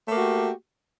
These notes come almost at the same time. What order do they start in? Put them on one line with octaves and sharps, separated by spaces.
A3 A#3 F#4 G4